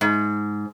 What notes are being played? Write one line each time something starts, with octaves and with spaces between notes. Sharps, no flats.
G#2